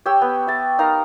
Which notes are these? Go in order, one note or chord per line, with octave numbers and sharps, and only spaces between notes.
G4 C#5 G5 E6
B3
E5 A5
D#4 A#4 F5 A#5